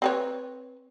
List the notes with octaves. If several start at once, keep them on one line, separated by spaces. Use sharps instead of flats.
C4 B4 C#5